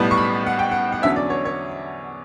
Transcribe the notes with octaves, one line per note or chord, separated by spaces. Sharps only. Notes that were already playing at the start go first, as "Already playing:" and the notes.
Already playing: B1 A2 G3 B3
C#6
B5
F#5
G5
F#5
F#5
E2 D3 F#3 C#4 E5
D5
C#5
C#5